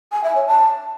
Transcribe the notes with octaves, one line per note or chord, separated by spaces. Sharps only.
G#5
E5
C#5
A5